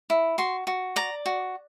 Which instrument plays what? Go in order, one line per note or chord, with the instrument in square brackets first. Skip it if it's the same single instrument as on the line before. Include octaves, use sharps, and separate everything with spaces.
[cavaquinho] E4
F#4 C6
F#4
D5 A#5
F#4